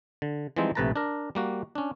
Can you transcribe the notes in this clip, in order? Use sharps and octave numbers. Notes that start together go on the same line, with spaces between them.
D3
E3 F3 G3 G#3 C4 D#4
A#1 C3 A3 B4 A5 A#5
D4 A#4
G3 A#3 F#4
C#4 D4